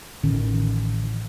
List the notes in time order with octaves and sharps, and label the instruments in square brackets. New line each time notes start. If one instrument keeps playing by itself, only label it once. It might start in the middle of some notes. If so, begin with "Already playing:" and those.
[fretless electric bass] A1 D3 D#3 C#4